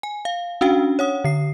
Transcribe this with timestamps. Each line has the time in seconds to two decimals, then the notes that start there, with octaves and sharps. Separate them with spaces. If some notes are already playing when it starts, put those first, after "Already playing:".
0.03 G#5
0.25 F5
0.61 C#4 D4 F#4 F5 G5
0.99 C#5 F#5 D#6
1.24 D3 C7